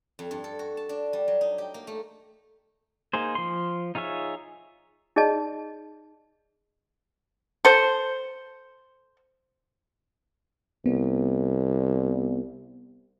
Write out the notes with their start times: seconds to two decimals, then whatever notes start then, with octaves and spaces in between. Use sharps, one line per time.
0.19 F2
0.31 G2
0.44 A4
0.59 F#4
0.77 A5
0.89 D4
1.13 G3
1.28 F#3
1.41 D#4
1.58 G4
1.74 A#3
1.87 A3
3.13 A#3 D#4 G#4 C5
3.35 F3 C6
3.95 D#4 F4 G#4 C#5 E5
5.16 D#4 G#4 D5 D#5 A5
7.65 A4 C5
10.86 C2 B3